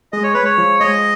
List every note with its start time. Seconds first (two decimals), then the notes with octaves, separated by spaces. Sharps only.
0.13 G#3 D#5
0.23 C#5
0.34 G#3 B4
0.45 C#5
0.58 F3
0.80 G#3 D#5